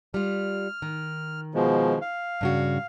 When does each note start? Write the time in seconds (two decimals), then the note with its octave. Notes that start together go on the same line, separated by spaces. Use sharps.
0.14 G3 F4 F6
0.82 D#3
1.54 B2 F3 G#3
2.01 F5
2.41 G2 C#3 F#4